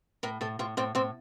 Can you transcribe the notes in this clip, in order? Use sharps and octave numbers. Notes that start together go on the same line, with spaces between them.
A2 A#4
A2 A4
A2 F4
A2 C4
A2 C4